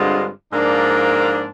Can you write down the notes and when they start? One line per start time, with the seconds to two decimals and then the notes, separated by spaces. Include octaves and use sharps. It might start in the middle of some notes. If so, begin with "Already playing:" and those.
Already playing: G2 D3 G#3 C4 F4
0.52 G#2 F3 A#3 D4